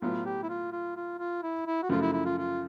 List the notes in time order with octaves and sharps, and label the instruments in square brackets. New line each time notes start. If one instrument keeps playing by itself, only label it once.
[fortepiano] A2 F#3 B3 [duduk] F4
[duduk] G4
E4
F4
F4
F4
F4
E4
E4
F#4
[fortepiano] F#2 C#3 F3 A3 [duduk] F4
[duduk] E4
E4
F4
F4